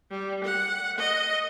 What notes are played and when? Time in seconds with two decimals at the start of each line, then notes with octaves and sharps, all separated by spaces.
0.11 G3
0.44 F#5
0.98 D#5